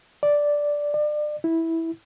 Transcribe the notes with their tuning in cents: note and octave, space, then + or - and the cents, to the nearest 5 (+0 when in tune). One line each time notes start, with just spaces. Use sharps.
D5 -5
D5 +30
E4 -10